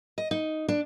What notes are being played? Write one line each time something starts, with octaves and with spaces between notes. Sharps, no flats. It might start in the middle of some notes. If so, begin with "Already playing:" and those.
D#5
D#4
D4